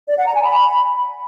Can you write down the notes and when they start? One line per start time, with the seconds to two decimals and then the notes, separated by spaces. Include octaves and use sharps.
0.08 D5
0.17 F#5
0.25 A#5
0.34 G#5
0.43 B5